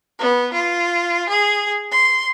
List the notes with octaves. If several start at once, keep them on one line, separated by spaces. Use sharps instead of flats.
B3
F4
G#4
C6